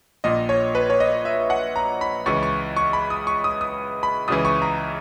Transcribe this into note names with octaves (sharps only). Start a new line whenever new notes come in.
A#1 A#2 D#5
C#5
B4
C#5
D#5
E5
F#5
A#5
B5
C#2 C#3 E3 C#6
C#6
C#6
B5
D#6
C#6
D#6
D#6
B5
C#2 C#3 E3 D#6
C#6
A#5